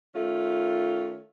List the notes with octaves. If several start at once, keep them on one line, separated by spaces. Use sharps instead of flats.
D#3 A3 C#4 F4